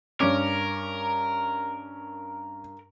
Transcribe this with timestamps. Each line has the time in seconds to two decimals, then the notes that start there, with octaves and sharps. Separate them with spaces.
0.20 G2 C#4 A#4 D6